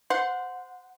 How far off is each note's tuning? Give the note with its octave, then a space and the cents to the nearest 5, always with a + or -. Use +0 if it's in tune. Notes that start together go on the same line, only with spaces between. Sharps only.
C5 -15 F#5 -20 C6 +0